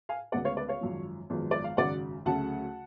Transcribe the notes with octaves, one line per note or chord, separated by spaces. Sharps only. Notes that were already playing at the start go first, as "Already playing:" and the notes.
F5 G#5
D2 C#3 G#3 B3 D5 F#5
C#5 F5
B4 D5
C#5 F5
G#1 F#2 F3
G#1 F#2 F3 G#3 B3
D5
F5
G#1 F#2 C#3 F#3 D5 F#5
D2 C#3 F#3 A3 C#4 F#5 A5